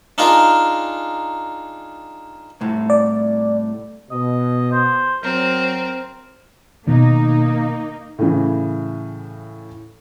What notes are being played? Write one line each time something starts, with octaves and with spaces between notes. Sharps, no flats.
D4 D#4 F4 G#4 A#4
C2 A2
D5
B2 D#5
C5
F#3 C4 A#4
B2 D#3 A#3 D#4
A2 C#3 E3